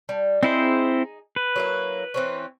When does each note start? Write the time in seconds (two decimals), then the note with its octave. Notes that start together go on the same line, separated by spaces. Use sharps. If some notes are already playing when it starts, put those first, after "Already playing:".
0.09 G3
0.43 C4 D#4 E4 G#4 C5
1.36 B4
1.56 F#3 A#3 E4
2.14 E3 C4 C#4